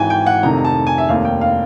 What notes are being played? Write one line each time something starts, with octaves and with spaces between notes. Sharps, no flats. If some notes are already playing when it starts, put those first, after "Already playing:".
Already playing: G#1 G#2 E3 G5 G#5
G5
F#5
F1 F2 C3 D#3 A#5
A5
G#5
E5
F1 D#2 D#3 F5
G5
F5